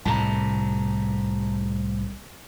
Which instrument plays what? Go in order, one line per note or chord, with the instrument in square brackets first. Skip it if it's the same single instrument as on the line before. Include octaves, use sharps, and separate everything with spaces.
[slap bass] C2 A2 C3 [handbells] A5 A#5